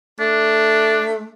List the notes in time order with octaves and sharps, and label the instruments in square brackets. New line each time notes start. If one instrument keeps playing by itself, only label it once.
[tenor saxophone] A3 [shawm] D4